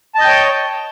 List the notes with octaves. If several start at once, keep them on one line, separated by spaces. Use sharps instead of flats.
C#5 D#5 G5 A5 G6